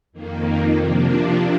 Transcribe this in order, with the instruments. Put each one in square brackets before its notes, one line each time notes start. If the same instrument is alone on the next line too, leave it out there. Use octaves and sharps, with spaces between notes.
[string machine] F2 D#3 A#3
C3 F3 A#3 D4